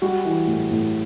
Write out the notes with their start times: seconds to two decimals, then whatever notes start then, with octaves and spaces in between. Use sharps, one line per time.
0.02 G3 F#4
0.25 E3
0.47 A2
0.71 A2